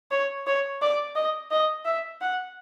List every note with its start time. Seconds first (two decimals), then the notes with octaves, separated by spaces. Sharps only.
0.11 C#5
0.47 C#5
0.82 D5
1.15 D#5
1.51 D#5
1.85 E5
2.21 F#5